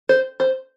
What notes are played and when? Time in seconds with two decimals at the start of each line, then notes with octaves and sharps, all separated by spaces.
0.09 C5
0.40 C5